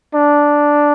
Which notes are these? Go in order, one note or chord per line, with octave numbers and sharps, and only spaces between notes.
D4